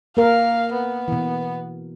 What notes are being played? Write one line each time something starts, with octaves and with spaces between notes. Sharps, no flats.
A#3 A#4 F5
B3
B2 E3